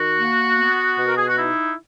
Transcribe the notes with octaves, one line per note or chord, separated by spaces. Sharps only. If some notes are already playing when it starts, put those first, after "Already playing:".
Already playing: D#3 F#4
A#3
B3
B2
A#4
G#4
F#4
D#4 E4